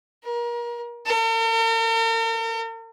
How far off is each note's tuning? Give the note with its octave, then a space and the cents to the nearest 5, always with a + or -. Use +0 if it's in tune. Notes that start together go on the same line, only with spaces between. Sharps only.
A#4 +30
A#4 -45